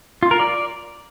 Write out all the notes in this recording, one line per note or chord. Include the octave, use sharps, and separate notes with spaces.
F4
A#4
D5